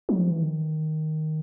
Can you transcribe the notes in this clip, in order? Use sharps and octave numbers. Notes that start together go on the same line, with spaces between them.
F#3
F3
E3
D#3